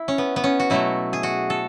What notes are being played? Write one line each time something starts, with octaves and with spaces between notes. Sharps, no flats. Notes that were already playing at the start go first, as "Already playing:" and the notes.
Already playing: E4
C#4
B3
B3
C#4
F#4
B2 F#3 A3 E4
G#4
F#4
A4